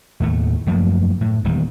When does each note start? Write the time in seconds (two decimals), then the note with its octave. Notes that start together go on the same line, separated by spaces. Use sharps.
0.20 D#2 A2 A3
0.67 F#2 F3 A3 A#3
1.21 A2
1.44 D#1 E2 D#3 G3